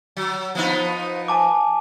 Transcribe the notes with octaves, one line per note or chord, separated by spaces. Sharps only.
F#3
F3 B3 D#4
G#5 A5 D6